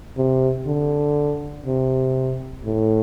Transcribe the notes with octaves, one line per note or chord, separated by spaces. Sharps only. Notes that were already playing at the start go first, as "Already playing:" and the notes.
C3
D3
C3
A2